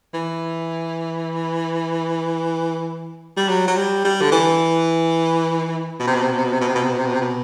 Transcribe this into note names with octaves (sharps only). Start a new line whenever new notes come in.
E3
G3
F#3
F#3
G3
G3
D3
E3
B2
C3
B2
C3
B2
C3
B2
C3
B2
C3
B2
C3
B2
C3
B2
C3
B2